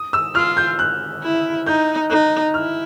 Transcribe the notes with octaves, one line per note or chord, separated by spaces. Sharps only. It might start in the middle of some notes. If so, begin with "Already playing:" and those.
Already playing: D#6
E6
F4 F6
G6
F#6
E4
D#4 G6
D#4 F#6
E4 F6